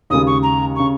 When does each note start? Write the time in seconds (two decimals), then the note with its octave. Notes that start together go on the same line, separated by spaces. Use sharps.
0.10 D#2 C#3 G#3 D#6
0.27 C#6
0.43 A#5
0.76 C#3 C#6